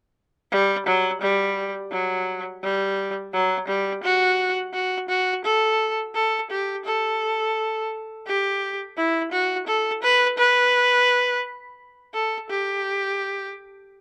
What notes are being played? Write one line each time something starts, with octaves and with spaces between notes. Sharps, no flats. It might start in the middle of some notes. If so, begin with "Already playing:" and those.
G3
F#3
G3
F#3
G3
F#3
G3
F#4
F#4
F#4
A4
A4
G4
A4
G4
E4
F#4
A4
B4
B4
A4
G4